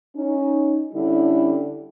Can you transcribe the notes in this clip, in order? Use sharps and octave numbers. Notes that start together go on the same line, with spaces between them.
C#4 D#4
D3 G3 C#4 E4